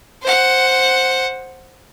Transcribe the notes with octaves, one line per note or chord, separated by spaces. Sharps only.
C5 F#5